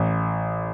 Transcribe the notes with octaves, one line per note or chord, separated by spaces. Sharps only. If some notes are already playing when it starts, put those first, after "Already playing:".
Already playing: A1